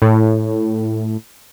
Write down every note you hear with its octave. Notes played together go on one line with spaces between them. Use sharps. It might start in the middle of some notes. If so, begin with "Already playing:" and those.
A2